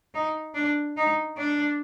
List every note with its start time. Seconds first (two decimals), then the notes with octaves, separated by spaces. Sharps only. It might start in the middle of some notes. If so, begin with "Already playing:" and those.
0.14 D#4
0.55 D4
0.97 D#4
1.38 D4